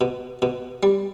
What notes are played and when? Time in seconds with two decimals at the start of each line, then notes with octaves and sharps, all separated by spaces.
0.01 B2
0.42 B2
0.83 G3